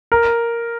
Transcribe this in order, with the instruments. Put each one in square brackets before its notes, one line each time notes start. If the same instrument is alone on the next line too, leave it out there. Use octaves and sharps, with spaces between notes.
[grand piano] A#4